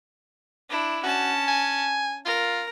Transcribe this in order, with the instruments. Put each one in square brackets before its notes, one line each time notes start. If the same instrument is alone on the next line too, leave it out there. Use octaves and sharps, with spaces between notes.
[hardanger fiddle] D4 E4
[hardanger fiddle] C#4 A5 [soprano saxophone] F#4
[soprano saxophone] G#5
[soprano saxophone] F4 [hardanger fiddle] A#4